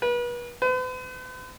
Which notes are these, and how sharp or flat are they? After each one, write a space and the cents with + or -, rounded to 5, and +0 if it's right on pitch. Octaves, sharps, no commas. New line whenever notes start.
B4 -35
B4 +45